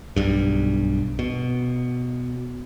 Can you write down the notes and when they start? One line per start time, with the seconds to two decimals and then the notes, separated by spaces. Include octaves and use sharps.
0.16 B1 G2
1.19 B2